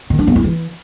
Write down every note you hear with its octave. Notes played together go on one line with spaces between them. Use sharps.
D#3
D4
B3
E4
E3